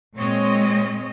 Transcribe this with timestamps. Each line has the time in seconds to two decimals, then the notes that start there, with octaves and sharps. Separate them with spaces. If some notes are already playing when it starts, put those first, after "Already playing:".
0.15 A#2 G#3 C4 C#5 D#5